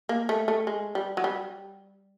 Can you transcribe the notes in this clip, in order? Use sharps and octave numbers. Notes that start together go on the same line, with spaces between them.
A#3
A3
A3
G#3
G3
F#3
G3